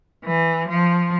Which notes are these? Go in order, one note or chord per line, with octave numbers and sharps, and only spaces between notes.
E3
F3